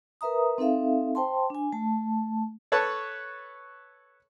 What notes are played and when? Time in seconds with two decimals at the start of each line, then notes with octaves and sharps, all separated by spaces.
0.21 A#4 B4 E5 A#5 D#6
0.58 C4 D#4 A4 E5 F5
1.15 C5 G5 A5 C6
1.50 D4 G#5
1.73 A3 A5
2.72 A4 B4 C#5 A5 C#6